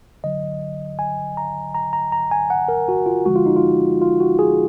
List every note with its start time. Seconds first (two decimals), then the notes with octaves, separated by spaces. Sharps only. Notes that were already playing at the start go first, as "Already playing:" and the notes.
0.24 D3 F#3 D#5
0.99 G#5
1.37 A#5
1.75 A#5
1.93 A#5
2.12 A#5
2.32 G#5
2.50 F#5
2.68 A#4
2.88 F#4
3.06 F4
3.26 D3 F3 G#3 F#4
3.36 F4
3.46 D#4
3.56 F4
4.01 F4
4.20 F#4
4.39 G#4